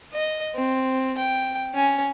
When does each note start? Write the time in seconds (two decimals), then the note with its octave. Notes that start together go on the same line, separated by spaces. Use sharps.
0.13 D#5
0.55 C4
1.18 G5
1.75 C#4 G#5